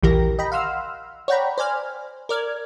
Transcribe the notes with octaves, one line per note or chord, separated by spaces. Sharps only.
A#1 D#2 E3 G4 A#4 A#6
D#5 G5 A#5 B5
F5 F#5 C6 E6 F6
C#5 D5 F#5 G5 A#5 B5
C5 D5 G#5 F6
A#4 D5 F6 G#6